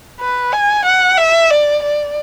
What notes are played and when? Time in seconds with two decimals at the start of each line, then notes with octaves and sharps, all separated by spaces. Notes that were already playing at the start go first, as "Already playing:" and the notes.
0.20 B4
0.53 G#5
0.85 F#5
1.18 E5
1.50 D5
1.83 D5